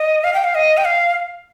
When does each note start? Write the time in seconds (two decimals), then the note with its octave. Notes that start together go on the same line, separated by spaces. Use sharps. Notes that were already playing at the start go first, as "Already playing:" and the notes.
Already playing: D#5
0.24 F5
0.34 G5
0.44 F5
0.55 D#5
0.77 G5
0.85 F5